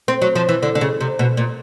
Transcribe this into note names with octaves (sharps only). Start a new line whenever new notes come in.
C4
F#3
F3
E3
D3
D3
C#3
C3
B2
A#2